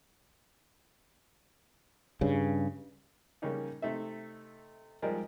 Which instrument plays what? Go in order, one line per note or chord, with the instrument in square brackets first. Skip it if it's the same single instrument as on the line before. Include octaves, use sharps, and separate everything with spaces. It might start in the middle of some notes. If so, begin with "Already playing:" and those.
[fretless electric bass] G2 C#3
[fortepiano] C#3 G3 A#3 C#4 D#4
C3 A3 D#4 E5
F3 G3 G#3 D#4 A#4 D5